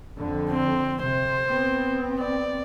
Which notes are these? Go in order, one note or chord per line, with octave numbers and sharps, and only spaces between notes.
F2 D3
C4
C3 C5
B3 C4
D5